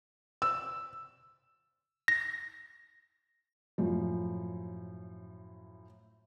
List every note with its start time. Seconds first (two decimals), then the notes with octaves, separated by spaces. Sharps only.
0.42 E6
2.08 A#6
3.78 F#2 A2 F3